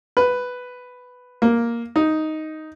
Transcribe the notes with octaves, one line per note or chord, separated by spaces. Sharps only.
B4
A#3
D#4